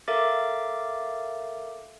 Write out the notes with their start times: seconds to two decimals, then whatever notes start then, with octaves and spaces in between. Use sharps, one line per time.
0.08 A4 A#4 E5 F5 D6 A6